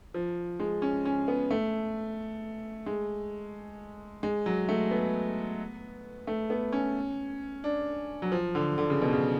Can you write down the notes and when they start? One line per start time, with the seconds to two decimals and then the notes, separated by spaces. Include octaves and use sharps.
0.14 F3
0.60 G#3
0.82 C#4
1.05 C#4
1.28 B3
1.51 A3
2.86 G#3
4.23 G#3
4.46 F#3
4.69 A3
4.91 B3
6.27 A3
6.50 B3
6.73 C#4
7.64 D4
8.22 F#3
8.32 F3
8.55 D3
8.78 D3
8.90 C#3
9.02 B2
9.13 C#3